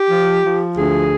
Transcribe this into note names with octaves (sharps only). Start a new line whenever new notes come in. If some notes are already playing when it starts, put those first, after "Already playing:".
Already playing: G4
F3
F3
D2 G#4